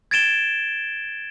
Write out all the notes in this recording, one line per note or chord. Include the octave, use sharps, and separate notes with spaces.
G#6 A6 D7 E7 G7